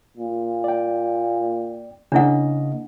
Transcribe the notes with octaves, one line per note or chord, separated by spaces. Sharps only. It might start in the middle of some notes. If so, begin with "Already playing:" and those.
A#2
D5 G5
C#3 A#3 D4 E4 D#5 F#5